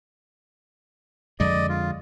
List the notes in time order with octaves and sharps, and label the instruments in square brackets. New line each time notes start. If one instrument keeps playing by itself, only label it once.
[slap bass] F2 D3 G#3 [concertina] D5 D#5
[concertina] F4